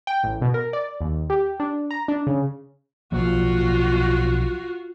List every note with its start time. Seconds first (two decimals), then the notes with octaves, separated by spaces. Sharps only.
0.07 G5
0.23 A1
0.42 B2
0.54 A#4
0.73 D5
1.01 D#2
1.30 G4
1.60 D4
1.91 A#5
2.08 D4
2.27 C#3
3.12 B1 F3 A#3 F4 F#4